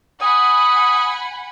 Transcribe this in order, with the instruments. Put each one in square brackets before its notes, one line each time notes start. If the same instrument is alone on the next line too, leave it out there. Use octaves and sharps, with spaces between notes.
[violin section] F#5 G#5 B5 [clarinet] D#6